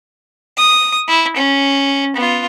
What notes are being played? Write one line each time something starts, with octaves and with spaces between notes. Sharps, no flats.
D#6
E4
C#4
B3 F4